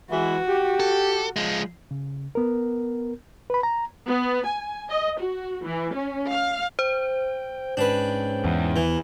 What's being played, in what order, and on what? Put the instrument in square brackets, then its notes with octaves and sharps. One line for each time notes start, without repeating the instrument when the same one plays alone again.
[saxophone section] E3 G#3 [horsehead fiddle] F#4
[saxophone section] G4
[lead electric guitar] A4
F3 G#3
[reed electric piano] C#3
B3 A#4
B4 B5
A#5
[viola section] B3
G#5
D#5
F#4
E3
C#4
F5
[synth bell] C5 [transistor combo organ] G5
[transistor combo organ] G#2 C#4 G5 [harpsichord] D4 B4
[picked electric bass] E2
[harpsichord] E3